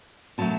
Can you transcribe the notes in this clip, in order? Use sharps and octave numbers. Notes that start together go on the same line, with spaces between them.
B2 F#3 A3 A5